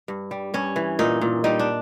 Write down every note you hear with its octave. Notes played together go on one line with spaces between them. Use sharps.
G2
G3
G2 C#4
E3
A#2 D#4
A#2
G3 D#4
D4